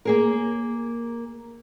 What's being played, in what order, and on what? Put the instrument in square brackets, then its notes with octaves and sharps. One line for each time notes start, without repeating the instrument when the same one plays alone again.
[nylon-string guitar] A#3 G#4 A#4